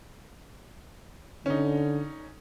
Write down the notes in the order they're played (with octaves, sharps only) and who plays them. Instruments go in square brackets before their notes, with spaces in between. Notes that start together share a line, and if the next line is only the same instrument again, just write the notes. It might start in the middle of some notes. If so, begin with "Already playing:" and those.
[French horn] D3 [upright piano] C#4 D#4